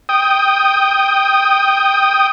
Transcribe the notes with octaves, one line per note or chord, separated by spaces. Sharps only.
G5 D#6